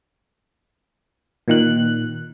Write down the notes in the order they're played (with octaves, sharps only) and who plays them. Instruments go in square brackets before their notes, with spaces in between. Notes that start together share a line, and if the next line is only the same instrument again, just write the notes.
[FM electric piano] A#2 D#3 F#6